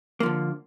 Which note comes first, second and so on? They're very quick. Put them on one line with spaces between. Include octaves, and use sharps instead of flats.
A#3 F3 D3